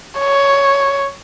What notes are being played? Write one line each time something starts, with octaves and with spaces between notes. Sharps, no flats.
C#5